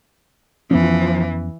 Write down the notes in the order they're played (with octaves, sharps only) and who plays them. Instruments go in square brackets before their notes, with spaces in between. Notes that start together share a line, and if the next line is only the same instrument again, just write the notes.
[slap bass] F2 B3 C#4 [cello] E3 [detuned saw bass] F3